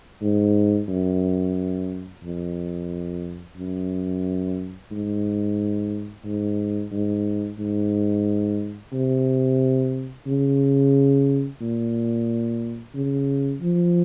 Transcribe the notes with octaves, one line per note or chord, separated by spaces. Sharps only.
G#2
F#2
F2
F#2
G#2
G#2
G#2
G#2
C3
C#3
A#2
C#3
F3